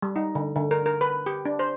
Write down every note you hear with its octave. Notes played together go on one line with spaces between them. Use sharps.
G3
D#4
D3
D3
A#4
A#4
B4
G4
D4
C5